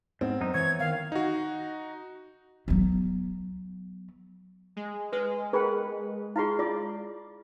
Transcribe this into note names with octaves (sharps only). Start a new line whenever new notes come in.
G#2 B3 C4
F#2 D#4
E3 C#5 G#6
D#3 F5
D#4 F#4
F#3 B3
G#3
G#3 B4
G#4 A#4 B4 G5 B5
E4 F4 G#4 F5 C6
F4 D5